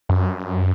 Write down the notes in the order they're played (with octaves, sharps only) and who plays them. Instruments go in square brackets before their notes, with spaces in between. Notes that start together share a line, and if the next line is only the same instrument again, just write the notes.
[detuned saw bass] F#2